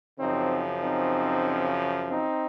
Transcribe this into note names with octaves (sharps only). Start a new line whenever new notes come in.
F#2 C#3 F3 C4 D#4
C4 D#4
C4 D#4